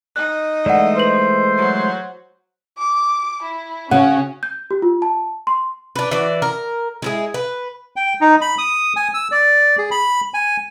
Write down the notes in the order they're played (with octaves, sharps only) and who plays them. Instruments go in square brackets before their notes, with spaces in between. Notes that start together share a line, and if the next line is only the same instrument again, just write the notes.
[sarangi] D#4 [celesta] F#6
[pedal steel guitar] E3 G#3 A3 [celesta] D5 F#5
[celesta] B4 F#7 [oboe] C5
[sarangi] F#3
[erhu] D6
E4
[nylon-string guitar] C#3 [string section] C#4 [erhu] F#4 [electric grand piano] F#5
[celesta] G6
G4
F4
A5
C6
[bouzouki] D4 B4
E3 F#4 D5
A#4
G#3 E4 G#4
B4
[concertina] G5
D#4
B5
D#6
G#5
E6
D5
G#4
B5
G#5